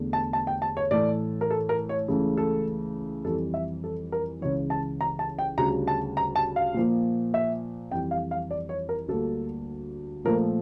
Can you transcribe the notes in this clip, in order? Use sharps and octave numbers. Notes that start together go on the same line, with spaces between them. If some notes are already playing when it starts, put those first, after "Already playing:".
Already playing: E2 D3 A3
A5
A5
G5
A5
C#5
A2 E3 A3 D5
A#4
A4
A#4
C#5
C#2 C#3 E3 A3
A4
F2 E3 G3 A4
E5
A4
A#4
C#2 C#3 E3 C#5
A5
A#5
A5
G5
D2 C#3 G3 A#5
A5
A#5
A5
F5
A#2 F3 A#3
E5
F2 E3 G3 G5
F5
F5
D5
C#5
A#4
D2 D3 G3 A#3 A4
A#2 F3 A3 A#4